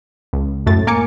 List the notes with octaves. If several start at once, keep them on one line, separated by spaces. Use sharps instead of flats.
C#2
F#2 A2 A3 A6
A#3 A#4 G#5 D6 C#7